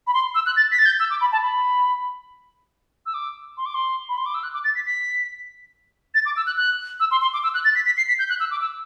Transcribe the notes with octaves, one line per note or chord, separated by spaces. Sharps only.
B5
C6
E6
F#6
A6
B6
A6
G6
E6
D6
B5
A5
B5
E6
D6
C6
D6
C6
B5
C6
D6
E6
F#6
D6
A6
B6
B6
A6
D6
E6
F#6
F#6
E6
C6
C6
D6
E6
F#6
A6
B6
B6
C7
B6
G6
F#6
E6
D6
E6